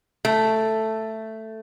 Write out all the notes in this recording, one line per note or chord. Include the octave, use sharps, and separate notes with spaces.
A3